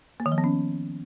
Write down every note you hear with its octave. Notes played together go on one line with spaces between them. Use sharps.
A#3
D#3
F3
B3
C#4